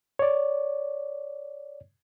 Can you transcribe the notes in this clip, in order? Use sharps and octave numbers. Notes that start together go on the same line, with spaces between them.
C#5 D5